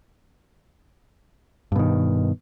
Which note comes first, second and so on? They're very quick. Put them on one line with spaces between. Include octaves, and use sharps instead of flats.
G2 B2 D#3